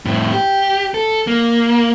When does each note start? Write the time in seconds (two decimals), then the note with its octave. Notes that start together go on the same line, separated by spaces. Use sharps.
0.05 F2 A2
0.33 G4
0.94 A4
1.27 A#3